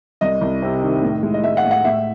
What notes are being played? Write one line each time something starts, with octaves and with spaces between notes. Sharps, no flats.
C2 D#5
C2
C3
D#3
A2
G#3
D#5
G#3 E5
F#5
A2
F#5
A2 E5